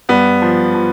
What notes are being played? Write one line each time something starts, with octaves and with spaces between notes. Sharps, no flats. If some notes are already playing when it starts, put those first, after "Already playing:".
G2 B3
F3
F3